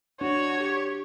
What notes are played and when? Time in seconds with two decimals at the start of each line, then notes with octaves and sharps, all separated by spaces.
0.21 D4 F#4 C#5
0.61 G4